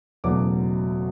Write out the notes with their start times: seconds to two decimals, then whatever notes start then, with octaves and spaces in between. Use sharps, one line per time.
0.24 F#1 E2 B2 F#3 A3 D6